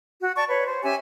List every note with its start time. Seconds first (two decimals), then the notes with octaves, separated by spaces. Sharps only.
0.20 F#4
0.36 D5 A5 C#6
0.48 B4 C#5
0.66 C5
0.83 C#4 G4 E5 G#5